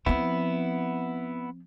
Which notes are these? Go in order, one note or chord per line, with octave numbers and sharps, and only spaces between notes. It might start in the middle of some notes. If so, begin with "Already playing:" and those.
F3 B3 C4 E4